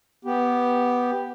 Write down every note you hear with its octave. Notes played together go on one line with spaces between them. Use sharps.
B3 G4